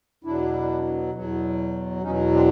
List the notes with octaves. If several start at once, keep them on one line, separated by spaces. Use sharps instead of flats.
E2 B2 F#3 D4 E4
E2 B2 F#3
E2 B2 F#3 C#4 D#4
C4 D4